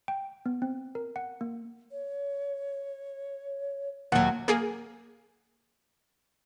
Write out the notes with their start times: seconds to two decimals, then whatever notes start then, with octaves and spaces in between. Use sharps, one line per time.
0.08 G5
0.46 B3
0.62 C4
0.95 A#4
1.16 F#5
1.41 A#3
1.92 C#5
4.12 D#2 F#3 F#5
4.48 A#3 G#4